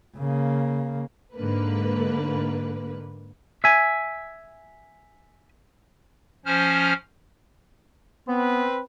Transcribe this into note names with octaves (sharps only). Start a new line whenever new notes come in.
C#3 A#3
G#2 D3 A#3 B4
E5 G#5
F3 C#4 C5 F6
B3 C4 B4